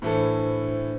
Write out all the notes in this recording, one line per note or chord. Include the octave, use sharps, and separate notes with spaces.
A2 E3 D4 A4 C5